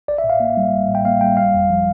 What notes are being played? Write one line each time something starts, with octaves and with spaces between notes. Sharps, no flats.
A1 D5
E5
A2
F5
A#3
G3
A1
A2
G5
A#3 F5
G3 G5
G1 F5
F2
F3